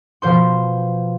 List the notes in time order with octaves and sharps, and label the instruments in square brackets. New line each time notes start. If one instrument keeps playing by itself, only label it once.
[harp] B2 F3 C5 C6